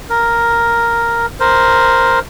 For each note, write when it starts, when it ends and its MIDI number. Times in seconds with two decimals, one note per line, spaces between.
0.10 1.26 70
1.40 2.19 70
1.40 2.19 72